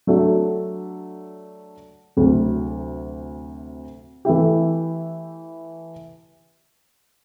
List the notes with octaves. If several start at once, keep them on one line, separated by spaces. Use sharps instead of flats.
F#3 A3 D4 F#4 A4
D2 C3 F#3
E3 A3 E4 G4